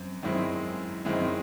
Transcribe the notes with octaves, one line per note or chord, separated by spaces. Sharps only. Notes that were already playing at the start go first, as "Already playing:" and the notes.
Already playing: F#2 C4
F#2 D#3 G#3 C4 E4
F#2 D#3 G#3 C4 E4